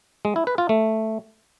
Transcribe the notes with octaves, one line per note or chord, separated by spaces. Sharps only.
G#3
E4
B4
F4
A3